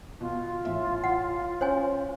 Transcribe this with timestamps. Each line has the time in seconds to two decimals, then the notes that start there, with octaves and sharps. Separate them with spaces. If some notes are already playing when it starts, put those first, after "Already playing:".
0.21 B2 F4
0.65 A1 E5
1.04 F#5
1.61 C#4 C5 C#5 G#5